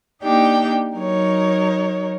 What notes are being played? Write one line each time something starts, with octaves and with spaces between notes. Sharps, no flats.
A#3 D4 D#4 G4 G5
F#3 D#4 A#4 C#5